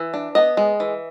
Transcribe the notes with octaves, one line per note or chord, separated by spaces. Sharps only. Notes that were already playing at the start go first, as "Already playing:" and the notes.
Already playing: E3
D4
B3 D#5
G#3
E3